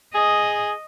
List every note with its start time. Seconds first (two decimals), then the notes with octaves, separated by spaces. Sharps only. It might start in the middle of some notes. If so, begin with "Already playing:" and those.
0.15 G#4 D#5